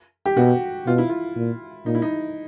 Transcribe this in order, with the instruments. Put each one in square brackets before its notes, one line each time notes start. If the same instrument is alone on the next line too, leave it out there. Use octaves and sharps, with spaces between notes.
[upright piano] G4
[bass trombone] B2 [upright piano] F#4
[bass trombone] B2 [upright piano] F4
[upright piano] E4
F4
[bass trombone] A#2
[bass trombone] A#2 [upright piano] D#4
[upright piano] E4
D#4